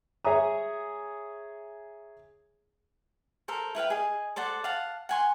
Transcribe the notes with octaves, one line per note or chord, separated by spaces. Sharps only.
G#4 C#5 E5 A#5 D#6
A4 A#4 C5
E4 B4 F5 G5
G#4 D#5
A4 C5 D5 F#5
F5 F#5 A5
F#5 G#5 C6